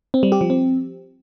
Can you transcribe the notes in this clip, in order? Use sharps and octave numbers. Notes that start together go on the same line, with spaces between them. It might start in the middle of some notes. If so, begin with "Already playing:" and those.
C4
G3
G4
F3
C4